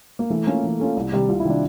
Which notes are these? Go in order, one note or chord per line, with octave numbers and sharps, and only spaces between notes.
A#3
E3 A3
A3 A#3 C#4 F4
E3
A3 C#4 F4
C2
C3 D#3 G3
C2 F4
E4
C3 D#3 G3 D4